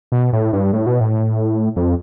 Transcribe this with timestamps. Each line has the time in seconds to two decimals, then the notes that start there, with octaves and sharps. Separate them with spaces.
0.12 B2
0.33 A2
0.53 G2
0.73 A2
0.87 B2
1.01 A2
1.76 F2